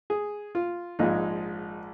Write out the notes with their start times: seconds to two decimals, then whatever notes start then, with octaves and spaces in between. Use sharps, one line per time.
0.10 G#4
0.55 F4
0.99 A#1 G#2 F3 G#3 D#4